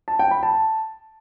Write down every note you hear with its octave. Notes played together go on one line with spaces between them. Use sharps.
A5
G5
B5
A5